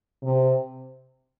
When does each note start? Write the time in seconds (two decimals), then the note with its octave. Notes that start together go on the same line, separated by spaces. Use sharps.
0.23 C3